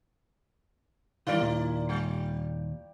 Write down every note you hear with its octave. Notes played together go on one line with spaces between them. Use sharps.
D#3 E3 G3 E4 A#4 D5
D#2 A#2
G3